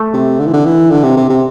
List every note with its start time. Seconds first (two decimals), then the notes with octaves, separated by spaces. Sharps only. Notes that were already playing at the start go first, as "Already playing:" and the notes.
Already playing: A3
0.14 C3
0.39 D3
0.46 E3
0.53 D3
0.65 E3
0.90 D3
1.03 C3
1.17 C3
1.30 C3